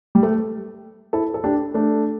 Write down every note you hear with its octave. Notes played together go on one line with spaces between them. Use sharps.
G3
A3
E4 A4
A4
D4 G4
A3 D4